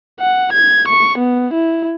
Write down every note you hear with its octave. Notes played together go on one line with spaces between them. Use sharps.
F#5
G#6
C#6
B3
E4